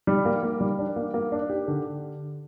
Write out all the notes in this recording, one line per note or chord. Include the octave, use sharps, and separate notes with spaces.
G3
A#3
A#3
G3
D4
A#3
A#3
D4
G4
D3